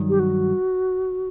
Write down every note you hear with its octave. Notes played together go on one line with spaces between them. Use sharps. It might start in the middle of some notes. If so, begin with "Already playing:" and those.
Already playing: G2 D#3 F#3
G4
F#4